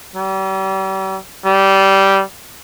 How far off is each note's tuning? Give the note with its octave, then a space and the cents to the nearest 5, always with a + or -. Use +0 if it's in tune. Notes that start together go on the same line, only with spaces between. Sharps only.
G3 -40
G3 -15